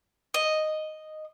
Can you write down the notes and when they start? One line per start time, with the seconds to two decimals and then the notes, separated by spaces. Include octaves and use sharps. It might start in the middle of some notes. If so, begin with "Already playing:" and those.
0.34 D#5